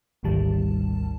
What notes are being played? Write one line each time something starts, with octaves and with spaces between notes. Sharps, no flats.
G#1 D2 G#2 D#3 G3 A5